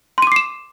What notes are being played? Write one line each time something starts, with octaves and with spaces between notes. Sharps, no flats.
C6 D6 C7 D#7 E7